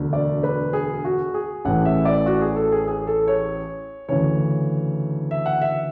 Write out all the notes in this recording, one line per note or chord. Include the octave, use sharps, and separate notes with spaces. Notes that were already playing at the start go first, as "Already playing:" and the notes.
Already playing: E1 D2 D3
D5
B4
G#4
F#4
G#4
A1 A2 E3 F#5
E5
D5
F#4
G#4
A4
G#4
G#4
A4
C#5
D2 C#3 E3 C#5
E5
F#5
E5